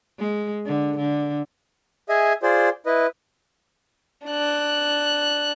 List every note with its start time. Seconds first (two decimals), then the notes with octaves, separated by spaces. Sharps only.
0.19 G#3
0.66 D3
0.97 D3
2.09 G#4 D#5 E5 G#5
2.43 F4 G#4 C5 D5
2.86 E4 B4 D#5
4.26 D4 F#6